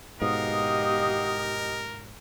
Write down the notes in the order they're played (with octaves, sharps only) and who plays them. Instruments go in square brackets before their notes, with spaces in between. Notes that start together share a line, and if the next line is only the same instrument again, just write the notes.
[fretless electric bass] G#2 B2 [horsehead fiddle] G4 D#5 [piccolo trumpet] A#4 [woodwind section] F5 F#5 D#6